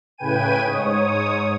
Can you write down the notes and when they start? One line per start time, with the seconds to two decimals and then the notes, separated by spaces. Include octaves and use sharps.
0.18 A2 C#3 B4 G5 G#5 D#7
0.65 G#2 C#5 D#6